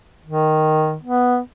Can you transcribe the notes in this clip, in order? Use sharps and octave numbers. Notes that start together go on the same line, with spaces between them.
D#3
B3